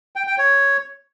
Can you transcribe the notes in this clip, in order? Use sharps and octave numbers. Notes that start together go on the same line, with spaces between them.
G5
G5
C#5